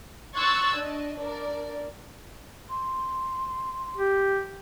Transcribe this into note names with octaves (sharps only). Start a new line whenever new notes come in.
C6 C#6 E6 F#6 G#6 A6
D4 D#5
D4 A#4 D5
C6
G4